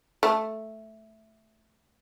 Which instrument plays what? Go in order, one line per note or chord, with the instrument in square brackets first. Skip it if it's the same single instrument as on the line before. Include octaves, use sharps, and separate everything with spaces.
[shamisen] A3